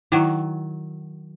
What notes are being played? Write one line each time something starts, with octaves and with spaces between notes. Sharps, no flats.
D#3 F#3 E4